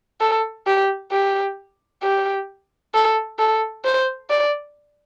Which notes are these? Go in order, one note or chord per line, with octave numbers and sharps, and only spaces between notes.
A4
G4
G4
G4
A4
A4
C5
D5